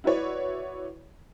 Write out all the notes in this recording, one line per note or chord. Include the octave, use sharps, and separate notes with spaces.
E4 F#4 B4 C#5 D5